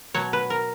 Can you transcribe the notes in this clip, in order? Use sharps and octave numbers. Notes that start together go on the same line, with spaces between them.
B2 F#3 C#5
B4
A#4